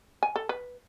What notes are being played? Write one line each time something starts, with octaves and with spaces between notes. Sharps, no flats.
G#5
A4
B4